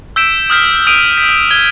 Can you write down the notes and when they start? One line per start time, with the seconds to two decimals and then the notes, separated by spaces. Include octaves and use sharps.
0.16 E6 G6 B6 D7 E7
0.50 D#6 F6 G6 B6
0.87 D#6 D7 D#7 F7
1.17 B6
1.51 G#6 G7